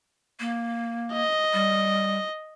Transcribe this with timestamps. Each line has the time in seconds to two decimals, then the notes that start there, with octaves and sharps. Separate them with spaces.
0.40 A#3
1.13 D#5
1.53 G3